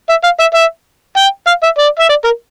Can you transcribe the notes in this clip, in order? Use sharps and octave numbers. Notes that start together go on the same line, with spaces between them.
E5
F5
E5
E5
G5
F5
E5
D5
E5
D5
A#4